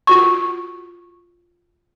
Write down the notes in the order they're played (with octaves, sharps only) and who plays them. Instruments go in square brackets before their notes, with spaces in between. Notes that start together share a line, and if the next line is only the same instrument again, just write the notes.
[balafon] F4 F#4 C#6